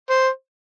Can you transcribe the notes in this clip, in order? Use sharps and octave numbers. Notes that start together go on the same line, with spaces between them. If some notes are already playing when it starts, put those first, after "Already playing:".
C5